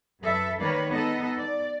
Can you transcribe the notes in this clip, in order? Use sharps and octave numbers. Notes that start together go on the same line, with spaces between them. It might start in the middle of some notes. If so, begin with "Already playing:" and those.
F#2 A4 B4 E5
D#3 G3 A#3 B4 C#5 D5
G#3 B3 D#4 A4 D#5
D5